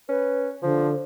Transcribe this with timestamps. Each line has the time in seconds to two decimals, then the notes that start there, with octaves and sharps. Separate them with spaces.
0.09 C#4 B4
0.63 D3 F3